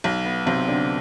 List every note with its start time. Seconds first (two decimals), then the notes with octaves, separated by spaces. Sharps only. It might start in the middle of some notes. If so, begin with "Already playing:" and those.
0.04 B1
0.25 B3
0.46 B1 C3 C4
0.68 D3 D4